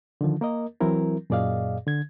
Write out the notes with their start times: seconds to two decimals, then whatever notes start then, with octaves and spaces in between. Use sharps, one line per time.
0.21 D3 D#3 F3
0.41 A#3 A#4 D#5
0.80 E3 F#3 C4 E4 A#4
1.30 F#2 A#2 G#4 D5 D#5 F5
1.87 D3 G#6